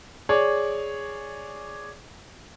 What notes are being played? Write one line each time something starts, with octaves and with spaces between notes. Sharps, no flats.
G#4 C#5 D5